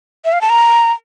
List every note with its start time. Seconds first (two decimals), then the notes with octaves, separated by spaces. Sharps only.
0.25 E5
0.33 F5
0.41 A5
0.49 A#5